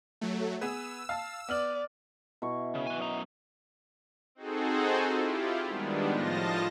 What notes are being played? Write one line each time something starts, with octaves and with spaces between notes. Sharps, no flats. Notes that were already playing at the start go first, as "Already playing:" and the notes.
F#3 A3
B3 G#4 B4 E6
F5 A5
B3 D5 F6 F#7
B2 E4 C#6
C#3
B4 G#5
F#2 D#5 A#5
C4 D#4 F#4 G#4 A4 C5
E4 F4 G4
D#3 G3 G#3 B3 D4
A2 F3 F4 D#5 A5 A#6